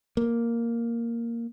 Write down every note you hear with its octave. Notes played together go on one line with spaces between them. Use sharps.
A#3